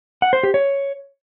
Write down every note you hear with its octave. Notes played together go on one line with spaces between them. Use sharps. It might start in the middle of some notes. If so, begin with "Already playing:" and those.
F#5
C5
G4
C#5